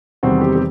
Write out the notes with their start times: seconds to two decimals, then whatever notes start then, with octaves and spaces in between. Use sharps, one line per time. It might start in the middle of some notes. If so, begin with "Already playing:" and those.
0.23 E2 C3 D#3 G3 C4 F#4
0.41 G4
0.56 G4